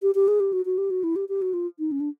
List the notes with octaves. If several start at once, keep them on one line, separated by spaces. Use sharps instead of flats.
G4
G4
G#4
G4
F#4
F#4
G4
F#4
E4
G4
G4
F#4
F4
D#4
C#4
D4